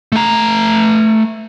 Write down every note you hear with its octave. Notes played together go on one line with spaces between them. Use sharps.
A3 A#5